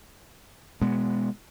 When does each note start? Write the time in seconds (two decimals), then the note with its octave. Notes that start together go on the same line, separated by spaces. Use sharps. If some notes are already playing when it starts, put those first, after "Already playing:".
0.81 B2 G#3 B3